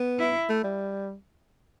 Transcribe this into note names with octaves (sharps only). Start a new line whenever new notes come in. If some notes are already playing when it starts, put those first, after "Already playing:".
Already playing: B3
E4
A3
G3